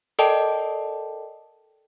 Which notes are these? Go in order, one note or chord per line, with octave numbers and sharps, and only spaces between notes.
A4 A#4 D5 D#5 G5 A5